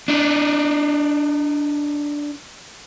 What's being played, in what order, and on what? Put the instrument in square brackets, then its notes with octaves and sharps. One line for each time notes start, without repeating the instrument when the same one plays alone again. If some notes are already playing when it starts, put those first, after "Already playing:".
[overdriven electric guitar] D4 D#4